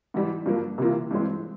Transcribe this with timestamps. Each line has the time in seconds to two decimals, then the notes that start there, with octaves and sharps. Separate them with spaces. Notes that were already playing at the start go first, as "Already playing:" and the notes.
0.14 G#2 E3 G3
0.46 G2 F3 A#3
0.78 C3 E3 A#3 F4
1.11 G2 E3 G#3 C4